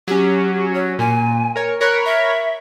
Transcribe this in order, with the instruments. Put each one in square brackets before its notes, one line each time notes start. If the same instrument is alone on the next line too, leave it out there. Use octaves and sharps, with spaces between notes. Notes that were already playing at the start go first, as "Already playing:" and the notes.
[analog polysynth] F#3 C#4 [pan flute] G4
[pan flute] C#5
[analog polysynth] A#2 [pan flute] G#5
[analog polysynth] A#4 C#5
[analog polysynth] A#4 C#5 B5 [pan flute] F#6
[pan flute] E5